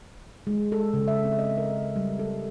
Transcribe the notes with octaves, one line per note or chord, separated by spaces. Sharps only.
G#3
A4
C#3
E5
C4
D#5
A#4
G3
A4